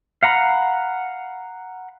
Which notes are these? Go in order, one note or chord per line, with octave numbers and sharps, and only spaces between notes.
F5 F#5 A#5 B5